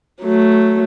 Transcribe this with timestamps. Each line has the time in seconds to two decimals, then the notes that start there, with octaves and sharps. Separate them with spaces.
0.21 F#3 A3